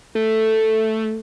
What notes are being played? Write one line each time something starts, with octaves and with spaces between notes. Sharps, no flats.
A3